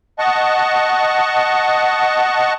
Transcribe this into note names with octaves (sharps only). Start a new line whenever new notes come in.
D#5 F#5 A5 C#6